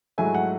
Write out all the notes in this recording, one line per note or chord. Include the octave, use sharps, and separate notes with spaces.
G#2 F#3 A3 E4 G#5
F#5